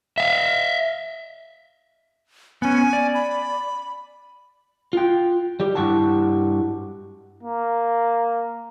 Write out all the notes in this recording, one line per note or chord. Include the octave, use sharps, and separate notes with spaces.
E5 F5
B3 C#4 G#5
D5
B5
F4 G5
G3 G4
G2 F3 E4 F#4 G4 A5
A#3